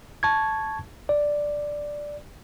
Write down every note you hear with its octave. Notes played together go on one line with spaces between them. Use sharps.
A5 C#6 G#6
D5